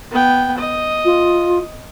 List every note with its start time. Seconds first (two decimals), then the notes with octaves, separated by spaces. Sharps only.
0.11 B3 G5
0.58 D#5
1.05 F4